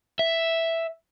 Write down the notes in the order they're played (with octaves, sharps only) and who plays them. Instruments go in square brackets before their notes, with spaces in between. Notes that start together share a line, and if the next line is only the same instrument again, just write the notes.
[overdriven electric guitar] E5